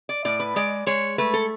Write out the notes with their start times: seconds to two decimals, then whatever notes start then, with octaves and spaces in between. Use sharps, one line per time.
0.09 D5
0.25 A2 D5
0.40 B4
0.56 G#3 D5
0.86 G#3 C#5
1.18 A3 B4
1.34 A4